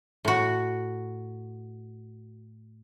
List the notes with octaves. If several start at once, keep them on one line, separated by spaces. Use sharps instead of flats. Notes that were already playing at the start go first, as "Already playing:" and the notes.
A2 F#4